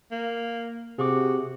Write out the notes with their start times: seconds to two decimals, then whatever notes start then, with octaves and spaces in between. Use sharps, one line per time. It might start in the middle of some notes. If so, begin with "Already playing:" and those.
0.12 A#3
0.99 C3 F#4 G#4 D6